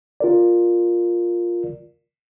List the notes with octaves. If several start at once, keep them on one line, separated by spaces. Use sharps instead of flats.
F4 A#4 D5